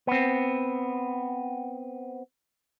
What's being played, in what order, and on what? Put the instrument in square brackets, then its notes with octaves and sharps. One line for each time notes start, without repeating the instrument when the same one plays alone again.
[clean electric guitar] B3 C4